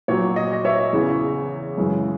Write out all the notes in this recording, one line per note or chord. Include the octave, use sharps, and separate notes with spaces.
A#2 F#3 C#5
D#5
D#5
C#5 E5
E2 C#3 E3
F#2 C#3 E3 G#3